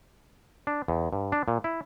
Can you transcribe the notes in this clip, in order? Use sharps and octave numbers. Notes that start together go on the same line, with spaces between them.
D4
E2
G2
D4
A#2
E4